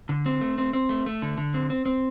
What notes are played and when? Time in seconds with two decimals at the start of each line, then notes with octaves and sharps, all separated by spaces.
0.09 D3
0.26 C4
0.41 A3
0.58 C4
0.73 C4
0.89 A3
1.06 A3
1.22 D3
1.38 D3
1.54 C4
1.70 C4
1.86 C4